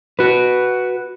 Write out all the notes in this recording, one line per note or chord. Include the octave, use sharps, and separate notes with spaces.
F#4 B4